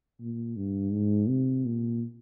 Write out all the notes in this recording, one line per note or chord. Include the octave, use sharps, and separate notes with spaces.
A#2
G2
G#2
C3
A#2